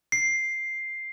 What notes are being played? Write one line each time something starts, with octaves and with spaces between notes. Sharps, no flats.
C7